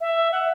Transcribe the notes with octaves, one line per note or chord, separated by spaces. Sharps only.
E5
F#5